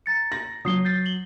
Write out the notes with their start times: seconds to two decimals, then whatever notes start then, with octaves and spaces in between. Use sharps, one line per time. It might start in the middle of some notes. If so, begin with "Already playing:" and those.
0.06 A#5 A6 C#7
0.32 A#6
0.65 F#3 D#6 C7 G7
0.85 G6 A6 C7
1.06 F#7 G7